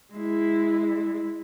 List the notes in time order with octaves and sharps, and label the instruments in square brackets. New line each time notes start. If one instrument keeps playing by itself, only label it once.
[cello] G#3 E4